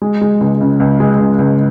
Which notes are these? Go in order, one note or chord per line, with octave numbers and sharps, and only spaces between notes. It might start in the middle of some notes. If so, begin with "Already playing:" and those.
G#3
G#3
C#2
C#3
C#2
G#3
C#2
C#2